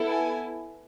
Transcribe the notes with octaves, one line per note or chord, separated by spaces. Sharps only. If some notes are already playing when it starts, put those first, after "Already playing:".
Already playing: B3 E4 A4
G#5